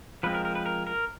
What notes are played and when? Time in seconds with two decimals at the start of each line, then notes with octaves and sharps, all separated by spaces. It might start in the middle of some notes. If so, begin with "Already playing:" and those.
0.23 F3 G#3 C4 B4
0.34 A#4
0.45 A#4
0.55 B4
0.66 A#4
0.87 A#4